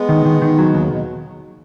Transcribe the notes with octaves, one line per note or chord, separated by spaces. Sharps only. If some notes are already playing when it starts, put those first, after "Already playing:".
Already playing: G#3 B3
D#3
D#3
D#3
F#3
D#2 C#3
B2